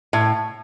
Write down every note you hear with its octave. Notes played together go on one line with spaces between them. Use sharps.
A2